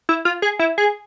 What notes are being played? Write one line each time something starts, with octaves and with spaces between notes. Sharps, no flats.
E4
F4
G#4
E4
G#4